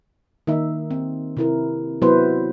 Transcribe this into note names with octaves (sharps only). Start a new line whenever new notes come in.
D#3 A#3 D#4 E5
C4
C3 E4 A#4
C3 F#3 B3 E4 B4 C5